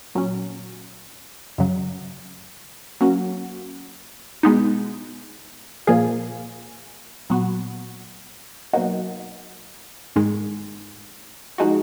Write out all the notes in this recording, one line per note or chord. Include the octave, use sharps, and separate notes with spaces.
A#2 F#3 C#4
F#2 C#3 F#3
F#3 A#3 C#4 F#4
B2 G#3 B3 D#4
A#2 F3 A#3 F4 G#4
A#2 F#3 B3 F#4
B2 F#3 A#3 D#4 F#4
G#2 D#3 G#3
F3 G#3 D#4 F#4